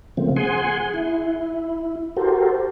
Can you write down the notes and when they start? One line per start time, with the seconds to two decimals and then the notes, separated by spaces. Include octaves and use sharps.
0.17 C#3 F3 A3 A#3 C4
0.36 G#4 F#5 G#5 C6
0.94 E4
2.17 F#4 G4 A4 A#4 C5